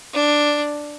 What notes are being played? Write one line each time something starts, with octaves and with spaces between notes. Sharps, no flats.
D4